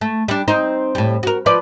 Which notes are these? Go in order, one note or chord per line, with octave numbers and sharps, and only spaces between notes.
A3
G3 D4
C4 D#4 C5
A2 G3
F#4 A#4
F3 B4 D5